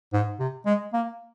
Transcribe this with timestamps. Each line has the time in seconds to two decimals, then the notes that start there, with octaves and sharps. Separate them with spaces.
0.13 G#2
0.39 C3
0.66 G#3
0.93 A#3